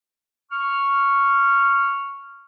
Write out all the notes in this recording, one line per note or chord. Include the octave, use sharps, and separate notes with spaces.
C#6 F6